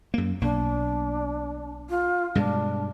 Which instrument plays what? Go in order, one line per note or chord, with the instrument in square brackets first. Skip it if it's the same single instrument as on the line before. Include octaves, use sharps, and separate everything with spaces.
[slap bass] F#2 A#3
[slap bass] B1 A#3 [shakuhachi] D4
[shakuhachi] F4
[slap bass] G2 B2 G#3 [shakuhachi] D4